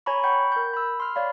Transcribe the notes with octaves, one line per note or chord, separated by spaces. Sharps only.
C#5 G#5 A#5 B5 C#6
F#5 G5 B5 C#6 G6
A#4 G6
B5 E6
C6 F6
C#5 D5 F5 B5